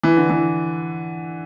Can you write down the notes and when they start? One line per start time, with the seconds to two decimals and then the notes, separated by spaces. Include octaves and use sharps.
0.03 E3
0.17 D3
0.30 E3